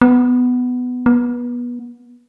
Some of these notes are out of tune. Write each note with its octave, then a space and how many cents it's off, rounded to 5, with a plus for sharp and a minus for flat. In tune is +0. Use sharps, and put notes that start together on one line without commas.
B3 +10
B3 -25